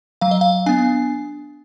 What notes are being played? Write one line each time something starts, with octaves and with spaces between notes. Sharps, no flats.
F#3 F5
D#5
F5
B3 D4 G#5